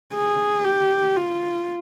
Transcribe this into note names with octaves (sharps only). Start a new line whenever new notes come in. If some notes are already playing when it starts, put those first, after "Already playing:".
G#4
G4
F4